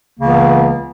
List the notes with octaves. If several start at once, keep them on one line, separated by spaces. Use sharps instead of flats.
C#2 C#3 E3 A#3 B3